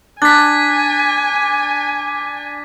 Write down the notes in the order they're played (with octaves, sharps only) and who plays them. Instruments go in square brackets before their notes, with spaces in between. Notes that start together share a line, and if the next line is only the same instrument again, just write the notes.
[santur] D4 [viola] G#5 [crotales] A6 B6